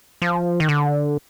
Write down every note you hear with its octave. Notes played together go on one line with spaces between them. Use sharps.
F3
D#3
D3